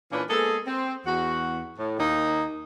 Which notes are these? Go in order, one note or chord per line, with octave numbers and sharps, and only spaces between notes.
A#2 E3 A#3 C#4 D4 B4
G#3 A#3 B3 G#4 A4
C4
E2 F#4
A2
D#2 A#3 D#4